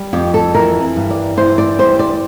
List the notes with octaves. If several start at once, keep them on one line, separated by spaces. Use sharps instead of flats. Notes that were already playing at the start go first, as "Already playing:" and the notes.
Already playing: G3
F2 G4
A4
E3 A#4
G2
D5
E3 C5
D5
G3 C5
D5